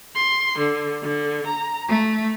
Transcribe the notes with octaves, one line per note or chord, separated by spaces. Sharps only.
C6
D3
D3
A#5
A3